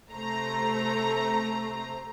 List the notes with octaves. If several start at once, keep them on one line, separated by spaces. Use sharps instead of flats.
C3 A3 C5 A#5